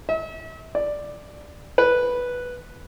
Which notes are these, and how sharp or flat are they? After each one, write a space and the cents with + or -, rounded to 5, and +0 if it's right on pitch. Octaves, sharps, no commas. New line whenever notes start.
E5 -40
D5 +5
B4 -5